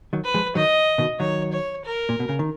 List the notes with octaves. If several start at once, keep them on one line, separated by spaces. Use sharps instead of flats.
D#3 F#3
B4
F3 G#3
D#3 F#3 D#5
B2 D#3
D#3 F#3 C#5
C#5
A#4
A#2
B2
C#3
D#3